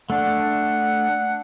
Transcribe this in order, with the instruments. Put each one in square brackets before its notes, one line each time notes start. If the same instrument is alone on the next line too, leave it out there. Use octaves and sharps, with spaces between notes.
[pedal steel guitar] A3 D4 [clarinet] F#5